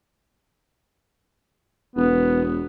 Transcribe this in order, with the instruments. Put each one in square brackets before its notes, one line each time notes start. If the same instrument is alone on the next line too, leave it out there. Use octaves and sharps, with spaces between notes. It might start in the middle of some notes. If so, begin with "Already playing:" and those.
[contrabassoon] E1 [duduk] B3